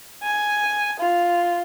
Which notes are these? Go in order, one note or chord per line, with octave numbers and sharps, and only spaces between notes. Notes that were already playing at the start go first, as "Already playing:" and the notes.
G#5
F4